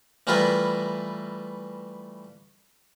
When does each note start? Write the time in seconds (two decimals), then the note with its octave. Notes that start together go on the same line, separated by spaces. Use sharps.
0.27 E3 G3 A3 F4 A#4 B4